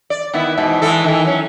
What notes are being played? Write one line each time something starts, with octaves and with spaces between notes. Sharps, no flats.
D5
D#3 B3 E4
G#2 B2 E3
E3 G#3 A4
D#3 E3
F#3 C#4